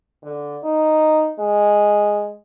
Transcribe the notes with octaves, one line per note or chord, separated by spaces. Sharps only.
D3
D#4
G#3